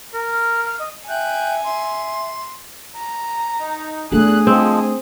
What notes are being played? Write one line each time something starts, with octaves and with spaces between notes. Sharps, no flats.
A#4
F6
F6
D#5
E5 G5 G#5 F#6 G6
E5 C6
A#5
D#4
E2 A3 D4 G#4 F#6
F3 G#3 C4